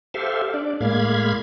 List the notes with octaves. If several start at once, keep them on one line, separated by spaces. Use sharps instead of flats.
G4 A4 C5 E5 F5
D4 D5
A2 G#3 A#3 F5 B5 G#6